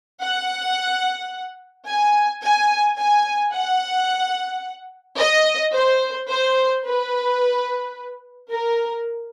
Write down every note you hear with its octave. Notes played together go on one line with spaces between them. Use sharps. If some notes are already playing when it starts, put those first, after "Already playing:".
F#5
G#5
G#5
G#5
F#5
D#5
C5
C5
B4
A#4